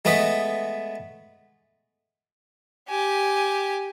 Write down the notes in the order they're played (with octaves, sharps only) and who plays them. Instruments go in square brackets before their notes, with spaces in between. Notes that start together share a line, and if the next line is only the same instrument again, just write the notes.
[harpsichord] G#3 A3 B3 B4 D#5
[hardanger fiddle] G4 G#5